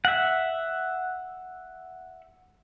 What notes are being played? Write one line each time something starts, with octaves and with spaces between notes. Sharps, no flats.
E5 F#5